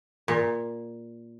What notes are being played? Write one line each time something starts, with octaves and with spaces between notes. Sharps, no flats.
A#2